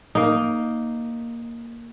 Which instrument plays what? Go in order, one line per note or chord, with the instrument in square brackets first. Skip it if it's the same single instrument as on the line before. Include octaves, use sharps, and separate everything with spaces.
[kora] A#3 D#4